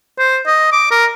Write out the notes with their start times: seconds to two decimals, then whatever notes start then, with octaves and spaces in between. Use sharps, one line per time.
0.19 C5
0.46 D#5
0.72 D6
0.91 A#4